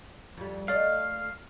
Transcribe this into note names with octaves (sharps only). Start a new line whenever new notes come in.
F2 G3
A3 D5 D#5 F5